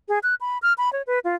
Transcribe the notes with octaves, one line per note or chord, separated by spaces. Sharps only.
G#4
F#6
B5
F6
B5
C#5
B4
F4